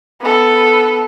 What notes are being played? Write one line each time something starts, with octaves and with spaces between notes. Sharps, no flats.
B3 A4